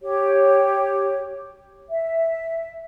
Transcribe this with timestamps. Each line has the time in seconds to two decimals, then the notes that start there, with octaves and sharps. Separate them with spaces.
0.01 G4 C#5
1.90 E5